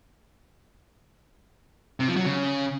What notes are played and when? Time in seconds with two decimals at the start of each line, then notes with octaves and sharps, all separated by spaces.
2.00 C3
2.08 F3
2.16 F#3
2.25 C#3